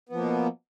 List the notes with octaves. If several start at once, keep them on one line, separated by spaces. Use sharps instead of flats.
B2 F3 A#3 B3